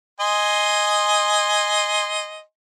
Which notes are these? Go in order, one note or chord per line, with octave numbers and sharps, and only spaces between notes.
D#5 G#5 C6